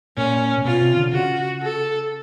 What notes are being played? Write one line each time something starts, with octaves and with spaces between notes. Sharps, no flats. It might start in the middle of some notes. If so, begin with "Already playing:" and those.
A#2 C#4
A#2
B2 F4
C3
D3
C#3 F#4
A4